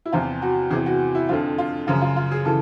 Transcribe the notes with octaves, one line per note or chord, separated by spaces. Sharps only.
E4
E2 C3 F3 F4
F#4
E2 C3 E3 G#4
F#4
E4
F2 D3 F3 F4
F4
F#2 C#3 F3 F4
F4
F4
G#4
C#3 E3 A4